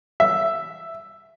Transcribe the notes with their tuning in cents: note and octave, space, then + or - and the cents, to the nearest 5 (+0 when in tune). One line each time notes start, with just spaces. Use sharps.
E5 +5